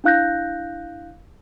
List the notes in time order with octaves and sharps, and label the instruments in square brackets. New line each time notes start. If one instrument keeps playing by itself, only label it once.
[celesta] D4 E4 F5 F#6 G6 A#6